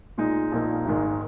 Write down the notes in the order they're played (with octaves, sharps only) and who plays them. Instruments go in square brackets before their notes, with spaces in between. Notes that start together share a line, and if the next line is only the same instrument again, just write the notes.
[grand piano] A#2 G#3 D#4
A#1 A#2 A#3 D#4
G#1 G#2 D#3 G#3